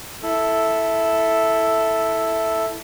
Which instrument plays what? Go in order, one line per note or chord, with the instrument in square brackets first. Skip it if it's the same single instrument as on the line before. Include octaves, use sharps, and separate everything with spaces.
[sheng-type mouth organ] E4 A4